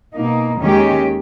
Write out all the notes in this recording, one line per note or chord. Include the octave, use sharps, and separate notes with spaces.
B2 A#3 D#4
D#2 D#3 G#3 C#4 G4